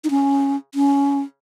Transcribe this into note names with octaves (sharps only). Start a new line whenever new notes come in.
D#4
C#4
C#4